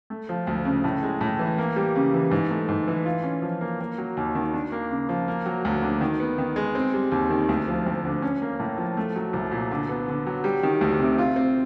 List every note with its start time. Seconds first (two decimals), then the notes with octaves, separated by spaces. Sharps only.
0.10 A3
0.29 F3
0.47 D2
0.65 C#3
0.84 A2
1.03 G#3
1.21 A2
1.39 E3
1.58 A#3
1.76 G3
1.95 C#3
2.14 E3
2.31 G#2
2.51 A3
2.69 G#2
2.88 E3
3.06 F4
3.24 C#4
3.42 F3
3.61 A#3
3.80 A#3
3.98 F#3
4.17 D#2
4.35 D#3
4.53 D4
4.72 A#3
4.91 C#3
5.09 F3
5.28 A#3
5.46 F#3
5.65 D2
5.82 D3
6.01 D#3
6.20 B3
6.38 D#3
6.56 G#3
6.75 C4
6.94 G3
7.12 D#2
7.30 D#3
7.49 D2
7.68 F3
7.86 D2
8.05 D3
8.22 C#4
8.42 A#3
8.60 A2
8.78 F3
8.97 A3
9.16 F#3
9.33 C2
9.52 A#2
9.71 D3
9.89 B3
10.08 D3
10.27 F#3
10.44 G3
10.63 D#3
10.81 D2
10.99 C3
11.18 F4
11.36 C4